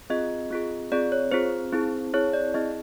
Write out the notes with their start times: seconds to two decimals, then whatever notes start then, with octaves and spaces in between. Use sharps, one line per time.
0.10 C4 F4 G#4 D#5
0.51 C4 F4 G#4
0.92 C4 F4 G#4 D5
1.12 C#5
1.32 C4 F4 G#4 C5
1.72 C4 E4 G#4
2.14 C4 E4 G#4 C#5
2.33 D5
2.54 C4 E4 G#4 D#5